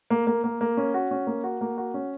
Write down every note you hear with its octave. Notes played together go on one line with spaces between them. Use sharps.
A#3
A#3
A#3
A#3
C#4
F#4
C#4
A#3
F#4
A#3
F#4
C#4